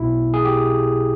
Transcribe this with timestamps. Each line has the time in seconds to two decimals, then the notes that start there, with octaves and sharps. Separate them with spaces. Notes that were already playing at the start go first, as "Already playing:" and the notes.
Already playing: B1 B2 E4
0.34 G#4
0.45 G4